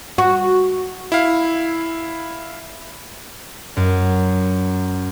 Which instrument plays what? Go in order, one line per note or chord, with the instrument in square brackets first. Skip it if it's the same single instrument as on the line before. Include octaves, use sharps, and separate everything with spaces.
[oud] F#4
[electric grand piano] E4 F5
[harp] F#2